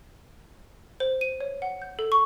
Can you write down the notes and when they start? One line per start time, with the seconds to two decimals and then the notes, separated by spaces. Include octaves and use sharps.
1.00 C5
1.21 D#7
1.41 C#5
1.62 F#5
1.82 G6
1.99 A4
2.12 C#6